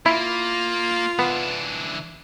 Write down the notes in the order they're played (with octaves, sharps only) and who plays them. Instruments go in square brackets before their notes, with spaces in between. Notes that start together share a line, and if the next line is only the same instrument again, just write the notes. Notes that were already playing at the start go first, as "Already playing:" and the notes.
[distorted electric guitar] A#3 [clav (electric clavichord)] E4 [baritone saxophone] F4
[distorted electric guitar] E3 D4 [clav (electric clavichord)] B3